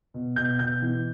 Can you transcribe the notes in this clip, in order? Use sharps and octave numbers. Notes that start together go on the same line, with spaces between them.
B2
B2 G6
B2 G6
E3